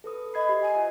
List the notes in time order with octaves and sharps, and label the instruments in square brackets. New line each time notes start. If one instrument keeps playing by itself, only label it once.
[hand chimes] A4 B4 D#6
[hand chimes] D#5 G#6 C7 [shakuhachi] B5
[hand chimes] G4 D#5 E5
[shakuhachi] G#5
[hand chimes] F4 C5 E5